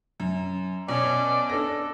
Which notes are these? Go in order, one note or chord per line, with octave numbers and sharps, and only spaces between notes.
F#2
B2 C#4 D5
D4 A4 A#6